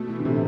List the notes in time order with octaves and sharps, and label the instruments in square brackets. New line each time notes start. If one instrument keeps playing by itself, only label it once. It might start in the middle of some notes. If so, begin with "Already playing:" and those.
Already playing: [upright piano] B2 [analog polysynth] A3
[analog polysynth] E3
[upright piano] D3
[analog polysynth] A2 [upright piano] C3